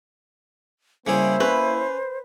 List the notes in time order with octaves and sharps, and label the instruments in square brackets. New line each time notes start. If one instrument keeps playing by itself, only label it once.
[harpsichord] C#3 G3 G#4 [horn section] A#3 E4 [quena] C5
[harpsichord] C#4 [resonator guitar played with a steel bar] B4